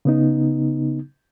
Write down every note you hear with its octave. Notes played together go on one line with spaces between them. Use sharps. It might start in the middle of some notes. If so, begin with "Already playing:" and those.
C#3 B3 D#4